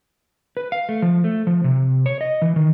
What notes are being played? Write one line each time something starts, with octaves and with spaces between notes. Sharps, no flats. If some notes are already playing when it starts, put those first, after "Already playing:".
B4
F5
A3
F3
A3
F3
C3
C#5
D#5
E3
D#3